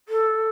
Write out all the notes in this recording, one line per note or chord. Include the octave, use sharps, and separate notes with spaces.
A4